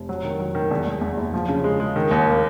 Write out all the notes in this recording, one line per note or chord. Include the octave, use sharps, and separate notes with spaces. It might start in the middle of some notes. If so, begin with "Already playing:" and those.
Already playing: F1
F#3
D#3
F#3
D#3
E2
E2
E2
F#1
F3
C#3
G#3
G#3
D#3
D#2
A#3